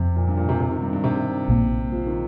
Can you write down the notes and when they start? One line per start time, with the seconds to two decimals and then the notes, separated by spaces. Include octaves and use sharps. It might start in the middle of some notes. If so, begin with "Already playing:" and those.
Already playing: F2 C3 F3 C4
0.16 A#2
0.27 G2
0.37 A#2
0.49 C3
0.60 C3
0.71 D#3
0.82 G2
0.93 G2
1.04 C3
1.48 A#1 A#2 A#3
1.92 F3
2.07 D#3